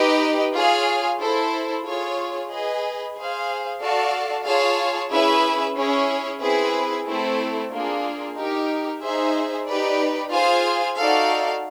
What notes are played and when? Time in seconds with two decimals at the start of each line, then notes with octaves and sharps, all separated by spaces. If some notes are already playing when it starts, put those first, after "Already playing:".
Already playing: D#4 G4 B4 D#5
0.54 F4 G#4 C#5 F5
1.20 E4 A4 C5
1.85 F4 G#4 C#5
2.50 G#4 B4 D#5
3.16 G#4 C5 F5
3.81 F#4 A4 D5 F5 A5
4.46 F4 G#4 C#5 F5 A5
5.10 C#4 E4 G#4 B4 E5
5.75 C#4 E4 G#4 C#5
6.41 C4 E4 G#4 B4
7.06 A3 C4 E4 A4
7.72 A#3 D4 F4 G#4
8.37 D#4 G4 A#4
9.02 D#4 G#4 C5 E5
9.68 D#4 G4 B4 D5
10.32 F4 G#4 C5 F5 G#5
10.97 D#4 F#4 A4 D5 F5